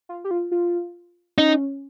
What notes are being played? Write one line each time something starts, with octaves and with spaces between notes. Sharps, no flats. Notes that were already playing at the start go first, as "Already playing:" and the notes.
F4
G4
F4
F4
C#4 D#4